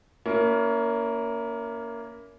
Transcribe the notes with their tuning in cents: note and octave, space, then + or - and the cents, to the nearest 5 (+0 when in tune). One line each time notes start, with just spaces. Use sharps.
A#3 +0 C#4 +30 E4 +0